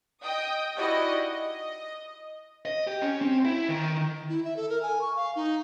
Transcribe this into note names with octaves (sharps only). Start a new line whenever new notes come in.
D#5 G5 D#6
D#4 E4 F#4 G4 D5 D#5
D#5
D#5
G4
C#4
C4
E4
D#3
E4
E5
A4
A#4
G#5
C#6
F5
D#4